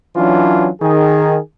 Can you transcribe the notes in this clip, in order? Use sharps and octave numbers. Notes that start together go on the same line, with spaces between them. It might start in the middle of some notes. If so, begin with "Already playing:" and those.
E3 F#3 C#4 D4 F4
D#3 G#4